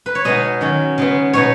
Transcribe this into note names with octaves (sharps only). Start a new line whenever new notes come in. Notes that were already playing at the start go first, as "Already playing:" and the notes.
B4
C#5
B2 G#3 B3 D#4 D#5
D#3 F#3 C#4
C#3 G#3 B3
B2 B3 D#4 C#5